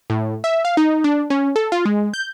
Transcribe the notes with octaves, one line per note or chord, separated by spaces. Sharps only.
A2
E5
F5
D#4
D4
C#4
A4
F4
G#3
G6